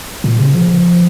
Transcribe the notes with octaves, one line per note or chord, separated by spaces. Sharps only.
A#2
C#3
F3